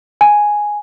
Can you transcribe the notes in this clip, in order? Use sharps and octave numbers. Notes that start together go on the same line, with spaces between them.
G#5